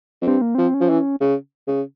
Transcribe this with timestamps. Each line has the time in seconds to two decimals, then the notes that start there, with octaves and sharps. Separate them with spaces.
0.22 F2
0.28 G2 C4
0.42 A#3
0.55 F3 C4
0.74 C#4
0.81 F3
0.90 E3
1.21 C#3
1.68 C#3